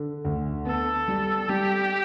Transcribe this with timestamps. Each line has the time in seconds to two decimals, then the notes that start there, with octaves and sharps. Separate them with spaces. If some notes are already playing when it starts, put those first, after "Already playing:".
Already playing: D3
0.25 D2
0.65 B3 A4
1.08 G3
1.49 G3 G4